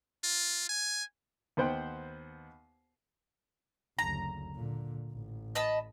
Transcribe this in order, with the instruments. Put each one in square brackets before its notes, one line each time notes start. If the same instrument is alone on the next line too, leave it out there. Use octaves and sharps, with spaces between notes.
[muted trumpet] F4
G#5
[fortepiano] D#2 B3 C5 F#5 G5
[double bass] F#1 D2 [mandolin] A#5
[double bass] A#2 D3
A1
[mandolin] D#5 A5 B5